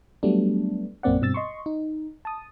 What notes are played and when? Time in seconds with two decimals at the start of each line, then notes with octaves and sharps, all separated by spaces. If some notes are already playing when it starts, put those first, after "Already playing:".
0.23 F#3 G3 A3 B3 D4
1.03 A#1 F#2 A#3 C4 D5 F#5
1.21 G2 B2 C4 E6 A6
1.34 D#5 C6 C#6
1.66 D#4
2.25 A5 D#6